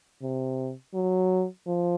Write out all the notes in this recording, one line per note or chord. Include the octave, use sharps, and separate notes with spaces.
C3
F#3
F3